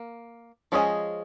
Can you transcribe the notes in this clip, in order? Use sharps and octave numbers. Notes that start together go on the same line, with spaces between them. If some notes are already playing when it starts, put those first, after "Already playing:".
Already playing: A#3
F3 G#3 C#4 G#4 D#5